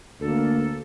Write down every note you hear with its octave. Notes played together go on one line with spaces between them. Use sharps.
D2 A#3 A4